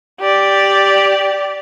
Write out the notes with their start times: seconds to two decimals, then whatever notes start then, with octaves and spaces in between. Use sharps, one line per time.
0.20 G4 D5